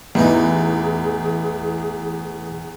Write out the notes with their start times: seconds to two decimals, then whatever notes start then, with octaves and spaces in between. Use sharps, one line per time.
0.15 A1 E2 E3 D#4 G#4